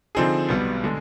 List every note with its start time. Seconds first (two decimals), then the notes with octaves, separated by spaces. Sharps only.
0.15 D3 F3 C4 D#4 G#4
0.49 B1 B2 G3 B3
0.84 D3 G#3